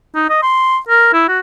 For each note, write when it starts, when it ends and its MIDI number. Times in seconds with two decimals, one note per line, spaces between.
0.15 0.28 63
0.30 0.41 75
0.43 0.77 84
0.89 1.09 70
1.13 1.28 64
1.28 1.39 66